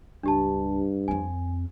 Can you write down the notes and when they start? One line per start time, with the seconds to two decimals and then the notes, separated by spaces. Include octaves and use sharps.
0.23 C#2 G2 D4 G4 A5
1.08 F2 C4 G#5